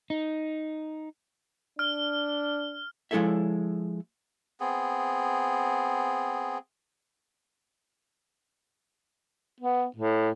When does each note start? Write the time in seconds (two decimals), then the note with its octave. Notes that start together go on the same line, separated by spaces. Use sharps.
0.10 D#4
1.79 D4 F6
3.11 F3 G#3 E4 A4 C#5 E5
4.60 B3 C4 G#4
9.60 B3
9.96 A2